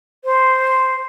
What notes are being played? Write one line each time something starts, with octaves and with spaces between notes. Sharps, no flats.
C5